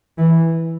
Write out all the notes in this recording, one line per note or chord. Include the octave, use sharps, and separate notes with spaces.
E3